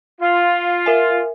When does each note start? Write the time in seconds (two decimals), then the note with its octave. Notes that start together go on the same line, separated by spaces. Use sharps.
0.21 F4
0.86 A#4 E5 G#5